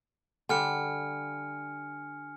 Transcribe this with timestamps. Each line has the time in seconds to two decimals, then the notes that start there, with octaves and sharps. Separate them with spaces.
0.49 D3 G3 G#5 F6 C#7